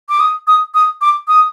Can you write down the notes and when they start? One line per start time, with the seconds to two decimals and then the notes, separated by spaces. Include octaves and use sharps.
0.09 D6
0.20 D#6
0.47 D#6
0.74 D#6
1.01 D6
1.28 D#6